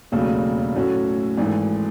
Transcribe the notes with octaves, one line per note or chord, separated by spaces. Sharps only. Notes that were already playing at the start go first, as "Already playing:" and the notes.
E1 D#2 C#3 F#3 A3
A2 F#3 A3 C#4 F#4
G#1 G#2 E3 A3